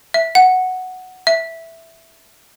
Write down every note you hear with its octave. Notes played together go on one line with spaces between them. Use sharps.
E5
F#5
E5